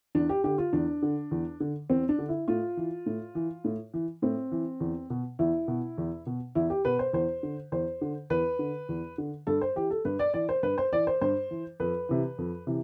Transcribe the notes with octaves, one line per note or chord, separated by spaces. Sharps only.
E2 D4
G4
D3 G4
F4
E2 D4
D3
E2
D3
E2 C4
D4
D3
E4
A2 F4
E3
A2
E3
A2
E3
A2 C4
E3
E2
B2
E2 E4
B2
E2
B2
E2 E4
G4
B2 B4
C5
E2 C5
D3
E2 C5
D3
E2 B4
D3
E2
D3
G2 A4
C5
E3 G4
A4
G2 B4
D5
E3 D5
C5
G2 B4
C5
E3 D5
C5
G2 C5
E3
F2 B4
C3 E3
F2
C3 E3